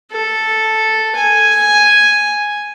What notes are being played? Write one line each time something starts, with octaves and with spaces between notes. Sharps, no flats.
A4
G#5